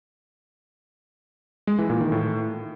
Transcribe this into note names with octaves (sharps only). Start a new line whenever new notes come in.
G#3
E3
A#2
D#3
A2